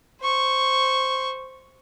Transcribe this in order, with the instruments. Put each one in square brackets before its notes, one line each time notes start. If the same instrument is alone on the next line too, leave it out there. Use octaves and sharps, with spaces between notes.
[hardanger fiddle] C5 C#6